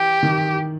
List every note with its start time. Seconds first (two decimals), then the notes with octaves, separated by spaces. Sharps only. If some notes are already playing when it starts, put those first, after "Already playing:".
Already playing: E3 G4
0.23 D#3